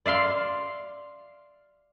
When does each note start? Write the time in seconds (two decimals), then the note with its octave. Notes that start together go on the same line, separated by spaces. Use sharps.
0.06 D5 E5 F5 C6